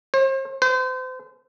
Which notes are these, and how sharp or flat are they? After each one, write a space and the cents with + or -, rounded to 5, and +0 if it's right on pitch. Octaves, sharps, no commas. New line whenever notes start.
C5 +40
C5 -35